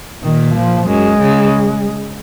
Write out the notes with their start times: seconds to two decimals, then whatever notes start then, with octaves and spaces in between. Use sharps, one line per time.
0.23 A#2 D#3
0.55 F3
0.88 F#2 G#3
1.20 C#3